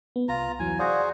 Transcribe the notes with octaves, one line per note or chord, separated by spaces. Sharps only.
B3
C2 F4 A#5
E2 E3 F#3 G#5
F#4 G#4 C5 D5 F5 G#5